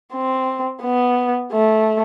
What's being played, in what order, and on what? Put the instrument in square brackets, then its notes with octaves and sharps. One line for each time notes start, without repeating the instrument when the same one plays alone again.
[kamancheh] C4
B3
A3